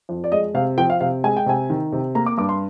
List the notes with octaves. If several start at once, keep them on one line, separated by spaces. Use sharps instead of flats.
F2
D5
G#3 D#5
C3 F5
F3 G5
F5
C3 F5
G#3 G#5
G5
C3 G#5
D#3
C3
A#3 A#5
D6
G2 D6
C6